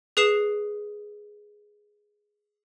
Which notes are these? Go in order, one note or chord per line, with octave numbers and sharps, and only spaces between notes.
G#4 B4 D#6 C7 E7